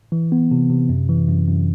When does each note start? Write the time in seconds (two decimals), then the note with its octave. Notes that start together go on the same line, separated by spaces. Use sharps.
0.12 E3
0.32 B3
0.51 C3
0.70 C3
0.89 F#2
1.09 E3
1.28 F#2
1.48 F#2